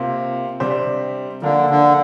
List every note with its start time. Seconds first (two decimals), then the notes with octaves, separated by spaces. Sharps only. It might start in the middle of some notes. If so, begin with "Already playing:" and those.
Already playing: C3 A#3 F4 C5
0.60 C3 G3 D4 G4 C5
1.42 D3 F3 A#3 D4 F4 A#4
1.70 D3